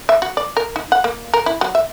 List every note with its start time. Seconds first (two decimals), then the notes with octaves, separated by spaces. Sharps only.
0.09 E5
0.22 F#4
0.37 D5
0.57 A#4
0.76 D#4
0.92 F#5
1.04 A#3
1.34 A#4
1.46 E4
1.61 F#3
1.75 E5